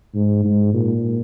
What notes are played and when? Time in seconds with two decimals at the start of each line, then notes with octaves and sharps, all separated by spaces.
0.15 G#2
0.44 G#2
0.74 A#2